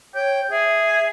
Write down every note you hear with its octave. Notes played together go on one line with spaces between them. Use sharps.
C#5 G5
G#4 E5